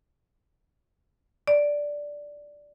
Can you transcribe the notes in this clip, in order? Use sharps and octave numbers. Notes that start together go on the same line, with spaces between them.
D5